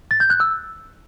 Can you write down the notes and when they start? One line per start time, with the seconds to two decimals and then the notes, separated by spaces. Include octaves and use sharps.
0.11 A6
0.20 G6
0.30 F#6
0.40 E6